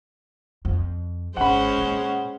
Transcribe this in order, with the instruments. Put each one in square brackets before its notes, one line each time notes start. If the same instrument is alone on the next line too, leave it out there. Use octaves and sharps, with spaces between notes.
[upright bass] F2
[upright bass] G#1 [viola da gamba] G#3 C#4 C5 [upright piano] F#5 B5
[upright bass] A#2